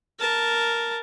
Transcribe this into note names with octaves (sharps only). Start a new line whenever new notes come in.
A#4 A5